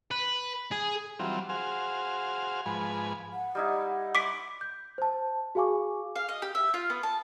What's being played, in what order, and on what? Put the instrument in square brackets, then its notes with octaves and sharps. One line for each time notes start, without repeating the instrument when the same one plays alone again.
[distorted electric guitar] B4
G#4
[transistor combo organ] E3 F#3 G3 C4 F4
F#4 G#4 C5 F5
G#2 F3 B4 G#5
[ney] F#5
[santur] G3 D#4 E4
[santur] F#5 B5 C6 [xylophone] D6 B6 D7
[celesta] G6
C5 A5
F#4 G#4 F5 G#5 C#6 D6
[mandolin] F5
D#5
G4
E5
F4
B3
A5